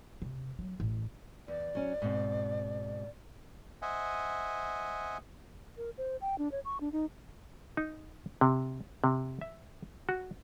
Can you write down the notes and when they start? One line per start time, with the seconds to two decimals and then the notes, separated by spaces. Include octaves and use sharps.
0.22 C3
0.59 F#3
0.80 A1
1.48 E2 D5
1.75 F#3 C#4
2.02 G#2 B2 C4
3.82 C5 D#5 E5 F#5 G#5
5.77 A#4
5.98 C5
6.21 G5
6.38 D4
6.52 C#5
6.65 C#6
6.81 D4
6.92 D#4
7.77 D#4
8.41 C3
9.04 C3
9.41 E5
10.09 F#4